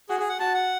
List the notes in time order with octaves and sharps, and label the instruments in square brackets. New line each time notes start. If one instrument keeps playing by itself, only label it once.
[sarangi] F#4 [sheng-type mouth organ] G#4
[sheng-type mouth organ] G#4
F#5
[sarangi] F#4 [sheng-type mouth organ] A5
[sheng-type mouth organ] F#5